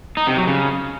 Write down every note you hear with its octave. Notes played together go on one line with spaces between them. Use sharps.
D#4
C3
F#3
C#3